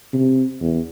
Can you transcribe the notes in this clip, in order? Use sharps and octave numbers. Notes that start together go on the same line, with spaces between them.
C3
E2